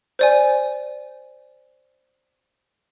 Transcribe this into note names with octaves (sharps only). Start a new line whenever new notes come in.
C5 D5 G#5